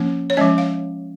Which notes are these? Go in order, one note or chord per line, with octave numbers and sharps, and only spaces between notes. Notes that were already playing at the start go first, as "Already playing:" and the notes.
Already playing: F3 A#3 C#4
C#5
F3 G#3 C#4 D#5
F5